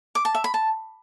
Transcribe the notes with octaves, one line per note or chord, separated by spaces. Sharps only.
D6
A5
E5
B5
A5